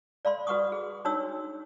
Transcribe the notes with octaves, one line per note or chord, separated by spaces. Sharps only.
D5 F5 B5 C6
F#4 B4 F#5 C#6 D#6
G#4
D4 D#4 F#4 C#5 E6